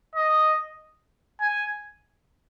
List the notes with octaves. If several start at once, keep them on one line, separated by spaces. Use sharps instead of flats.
D#5
G#5